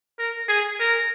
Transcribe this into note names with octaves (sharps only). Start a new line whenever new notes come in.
A#4
G#4
A#4